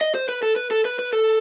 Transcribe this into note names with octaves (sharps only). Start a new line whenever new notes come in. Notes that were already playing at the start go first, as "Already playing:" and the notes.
D#5
C5
B4
A4
B4
A4
B4
B4
A4